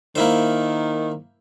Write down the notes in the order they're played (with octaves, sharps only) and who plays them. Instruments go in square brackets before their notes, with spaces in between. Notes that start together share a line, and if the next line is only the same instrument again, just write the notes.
[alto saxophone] D#3 [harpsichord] A#3 E4 C5